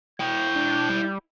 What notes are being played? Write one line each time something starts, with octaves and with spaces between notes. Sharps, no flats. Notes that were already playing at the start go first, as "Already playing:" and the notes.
E4 G5 G6
D4
G3